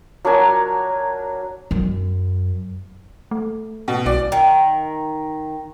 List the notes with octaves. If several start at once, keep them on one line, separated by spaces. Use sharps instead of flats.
F#3 D4 A#4 G#5
F#2
A3
B2
B1 D5
D#3